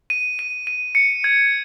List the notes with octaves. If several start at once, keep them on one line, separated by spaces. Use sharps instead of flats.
D#7
D#7
D#7
C#7
G#6